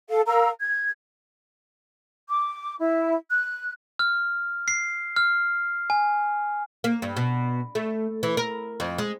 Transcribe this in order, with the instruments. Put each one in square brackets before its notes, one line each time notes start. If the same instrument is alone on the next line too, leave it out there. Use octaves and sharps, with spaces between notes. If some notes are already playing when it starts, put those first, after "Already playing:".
[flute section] A4 F5
A#4 F5 A#5 E6
G#6
D6
E4
F#6
[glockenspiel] F6
C7
F6
G#5
[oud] A#3
G2
B2
A3
E3
A#4
F2
G#3